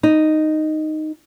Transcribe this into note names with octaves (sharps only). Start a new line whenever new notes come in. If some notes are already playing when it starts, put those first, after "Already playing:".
D#4